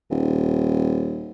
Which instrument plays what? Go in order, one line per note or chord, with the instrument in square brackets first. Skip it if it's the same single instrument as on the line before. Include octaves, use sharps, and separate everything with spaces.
[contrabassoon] D#1